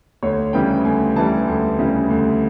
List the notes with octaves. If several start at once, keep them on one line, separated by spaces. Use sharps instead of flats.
D2 C#5
C#3 E3 G3 G5
D2 G#5
C#3 E3 G3 A5
D2
C#3 E3 G3
D2